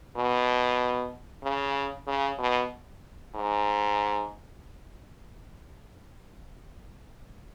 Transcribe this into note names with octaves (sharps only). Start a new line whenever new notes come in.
B2
C#3
C#3
B2
G#2